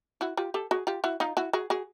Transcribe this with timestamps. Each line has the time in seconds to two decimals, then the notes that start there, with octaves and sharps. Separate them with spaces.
0.21 E4 F#4
0.37 F4 G4
0.54 G4 A4
0.71 F#4 G#4
0.87 F4 G4
1.04 E4 F#4
1.20 D#4 F4
1.37 E4 F#4
1.53 F#4 G#4
1.70 F#4 G#4